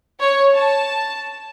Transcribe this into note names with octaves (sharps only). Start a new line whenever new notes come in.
C#5
A5